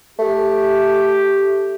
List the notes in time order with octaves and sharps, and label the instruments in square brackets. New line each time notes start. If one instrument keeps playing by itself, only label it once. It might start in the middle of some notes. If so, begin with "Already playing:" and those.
[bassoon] A3 [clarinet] G4